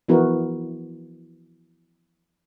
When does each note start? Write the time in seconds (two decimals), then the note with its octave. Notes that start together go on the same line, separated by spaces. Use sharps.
0.08 E3 F3 B3 E4 F#4 A#4